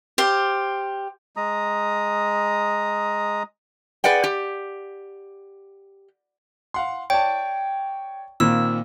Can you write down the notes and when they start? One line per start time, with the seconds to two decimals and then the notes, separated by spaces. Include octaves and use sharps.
0.18 G4 C5 F5
1.36 G#3 A#5 D#6
4.04 G#4 B4 D5 F#5 G5
4.24 G4
6.74 F5 F#5 C6
7.10 C#5 D5 G5 A5
8.40 A#2 D#3 A#3 C4 E6